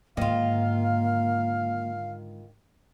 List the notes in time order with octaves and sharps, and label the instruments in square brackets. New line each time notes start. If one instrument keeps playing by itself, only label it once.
[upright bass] G#2 D3 [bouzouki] D#3 F4 [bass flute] A#3 [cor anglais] F5